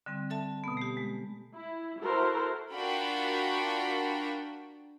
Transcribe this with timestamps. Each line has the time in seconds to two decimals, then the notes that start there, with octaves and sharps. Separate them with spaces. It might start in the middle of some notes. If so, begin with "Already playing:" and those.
0.06 D3 G3 C4
0.30 A4 E5 A5
0.64 B2 B3
0.77 A3 G4
0.97 G#3
1.53 E4
2.00 E4 F#4 A4 A#4 C5
2.74 D4 F4 F#4 A#4 G5 B5